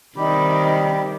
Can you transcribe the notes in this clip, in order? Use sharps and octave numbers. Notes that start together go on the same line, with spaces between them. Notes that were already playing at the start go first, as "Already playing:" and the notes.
C3 D#3 G3 C4 D#4 G4 B5